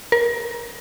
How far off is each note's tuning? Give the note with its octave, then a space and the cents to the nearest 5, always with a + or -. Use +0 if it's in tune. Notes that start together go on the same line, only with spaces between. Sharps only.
A#4 +25